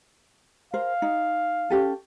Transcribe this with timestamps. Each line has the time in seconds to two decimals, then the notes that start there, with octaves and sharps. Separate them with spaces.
0.74 A#4 C5 F5
1.02 D#4
1.70 C#4 G4 A4